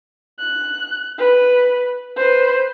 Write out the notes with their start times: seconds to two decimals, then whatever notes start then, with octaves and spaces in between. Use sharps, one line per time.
0.39 F#6
1.19 B4
2.16 B4 C5